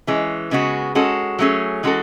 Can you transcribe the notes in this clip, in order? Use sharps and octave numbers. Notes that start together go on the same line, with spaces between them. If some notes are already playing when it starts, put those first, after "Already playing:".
E3 G#3 C#4
C#3 G#3 B3 D#4 F#4
G#3 C#4 F#4 A4
F#3 A3 C#4 G#4
E3 G#3 C#4 F#4 A4